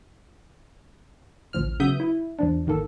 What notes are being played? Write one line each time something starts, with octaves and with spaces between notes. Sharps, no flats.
A1 D2 F3 F6
C#3 F#3 B3 E5 D#6 G6
E4
E2 F3 D4
G#1 D#3 A#3 A4